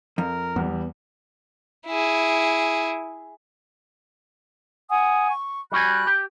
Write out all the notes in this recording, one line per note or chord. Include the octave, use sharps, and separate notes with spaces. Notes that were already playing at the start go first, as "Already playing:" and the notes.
F2 A#4
E2 G3 B3
E4 G#4
F#5 G#5 D#6
C#6
G3 F#4 G#5 B5 F#6
G4